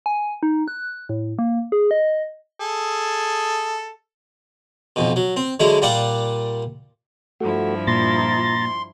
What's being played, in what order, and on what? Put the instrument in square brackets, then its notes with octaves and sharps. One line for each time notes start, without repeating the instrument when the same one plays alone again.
[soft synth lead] G#5
D#4
F#6
A2
A#3
G#4
D#5
[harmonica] G#4 A4
[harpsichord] B1 F2 B2
F#3
C4
D3 F#3 G#3 E4
A#2 G3 A#3 D5 F#5 D6
[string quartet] G2 F3 E4 [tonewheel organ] A3 F#4
[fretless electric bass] A#2 [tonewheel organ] A#5 A6 [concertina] C6